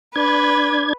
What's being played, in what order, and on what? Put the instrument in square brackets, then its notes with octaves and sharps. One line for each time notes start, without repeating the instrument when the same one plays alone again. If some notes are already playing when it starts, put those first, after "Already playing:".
[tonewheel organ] D4 G#6 [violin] B4